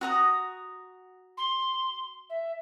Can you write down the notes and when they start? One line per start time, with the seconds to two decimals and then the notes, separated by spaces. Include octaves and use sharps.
0.01 F#4 A#5 D#6
1.37 C6
2.30 E5